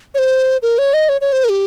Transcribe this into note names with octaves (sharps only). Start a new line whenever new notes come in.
C#5
C5
A#4
C#5
D#5
C#5
C#5
C5
A#4
G4